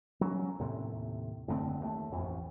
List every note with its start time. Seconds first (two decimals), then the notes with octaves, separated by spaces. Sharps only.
0.21 F#3 C#4
0.59 D#2 A2 C3
1.48 F#1 D3 A3 C4
1.80 D#2 A3
2.12 A1 F2